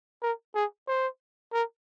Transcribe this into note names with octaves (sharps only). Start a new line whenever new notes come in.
A#4
G#4
C5
A#4